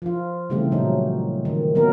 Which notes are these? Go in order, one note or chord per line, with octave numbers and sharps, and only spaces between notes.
F3 F4
C#3 E3 G3 A3 C4
A#2 F#3 D#4
D#3
F#3 A#3 B3 A#4